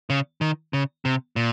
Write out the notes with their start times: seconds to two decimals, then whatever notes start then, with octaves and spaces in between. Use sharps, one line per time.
0.10 C#3
0.41 D#3
0.73 C#3
1.05 C3
1.36 A#2